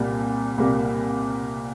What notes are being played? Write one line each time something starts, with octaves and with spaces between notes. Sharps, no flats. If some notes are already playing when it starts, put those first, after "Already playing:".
Already playing: C2 A#2 G3 A#3
C2 A#2 G3 A#3